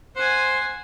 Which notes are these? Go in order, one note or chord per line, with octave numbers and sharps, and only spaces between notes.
C5 F#5 G#5